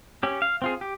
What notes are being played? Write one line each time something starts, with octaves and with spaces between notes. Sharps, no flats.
C#4 G4
F5
C4 F4 G#4
G4